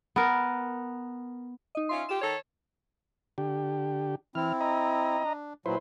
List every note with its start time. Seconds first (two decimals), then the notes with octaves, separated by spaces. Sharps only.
0.16 B3 A#4
1.75 D#4 D#5
1.89 C#4 F4 E5 C6
2.09 F4 G4 E7
2.21 D#3 A4 C#5
3.38 D3 G4
4.35 E3 C4 E4 F6
4.61 D#5 A#5
5.24 D4
5.66 A#2 F#3 E4 B4 C5